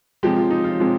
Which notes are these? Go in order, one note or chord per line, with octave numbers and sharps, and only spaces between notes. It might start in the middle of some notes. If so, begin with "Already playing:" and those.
C3 F3 G#3 G4
F4
D#4
F4
C3 F3 G#3